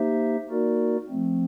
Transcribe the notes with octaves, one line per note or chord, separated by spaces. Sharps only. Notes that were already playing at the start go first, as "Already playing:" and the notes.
Already playing: A#3 D#4 G4 C5 E5
A#3 D#4 F#4 A#4 D5
F3 A3 C4